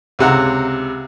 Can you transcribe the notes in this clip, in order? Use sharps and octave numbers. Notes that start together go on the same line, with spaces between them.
C#2 C3 F#5 A#5